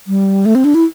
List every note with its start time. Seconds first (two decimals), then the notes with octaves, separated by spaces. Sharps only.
0.07 G3
0.46 A3
0.55 C4
0.64 D4
0.75 E4